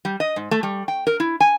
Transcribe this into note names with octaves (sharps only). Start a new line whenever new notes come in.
G3
D#5
G#2
A3
G3
G5
A#4
E4
G#5